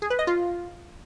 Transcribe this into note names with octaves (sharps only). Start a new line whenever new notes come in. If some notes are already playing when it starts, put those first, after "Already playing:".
G#4
B4
D#5
F4